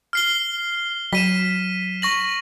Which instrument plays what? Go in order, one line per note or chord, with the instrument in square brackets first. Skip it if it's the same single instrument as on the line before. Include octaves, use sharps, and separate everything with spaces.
[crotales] F6 C7 G7
[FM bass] F#3 [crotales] B6 D#7 E7
[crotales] C#6 A#6 F#7